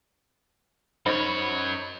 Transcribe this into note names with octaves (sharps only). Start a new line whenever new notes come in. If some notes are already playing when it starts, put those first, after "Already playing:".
F#2 D#4 C5 C#5 B5